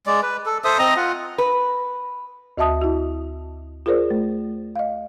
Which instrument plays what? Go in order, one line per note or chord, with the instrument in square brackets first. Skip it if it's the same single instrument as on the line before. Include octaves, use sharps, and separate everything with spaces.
[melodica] G#3 D5
B4
A4
A4 C5 E5 D#6
C4 D#5 A#5 D#6
F4 F#5
[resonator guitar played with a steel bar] B4
[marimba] D2 F#4 D#5 E5 A5 D#6
E4 F#4
F4 G#4 A#4 C5 D5
A3
D#5 F5